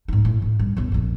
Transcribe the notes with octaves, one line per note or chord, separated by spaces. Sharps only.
G#2 D#4
A2
A2
G2
B1 F#2
A#1 F2